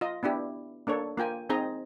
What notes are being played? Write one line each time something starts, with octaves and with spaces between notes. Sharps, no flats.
F4 D#5
B3 D4 E4 G4
A#3 D4 A4 C#5
A#3 F4 G5 G#5
C4 D#4 G#4 D#5 A#5